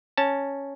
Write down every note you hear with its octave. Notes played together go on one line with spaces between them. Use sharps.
C#4 A5